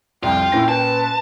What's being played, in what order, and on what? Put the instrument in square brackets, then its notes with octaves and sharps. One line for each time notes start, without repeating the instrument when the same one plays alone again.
[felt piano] C2 F2 [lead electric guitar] F4 [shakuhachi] G5
[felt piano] A#2 C#4 A#6 [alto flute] E4
[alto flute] B4 [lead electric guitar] A5